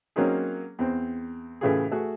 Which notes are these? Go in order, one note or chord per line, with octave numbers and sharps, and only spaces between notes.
F#3 A#3 C4 C#4 D#4 G#4
E2 C4
A2 C#3 E3 F4 G4 G#4
A3 F#4 G#4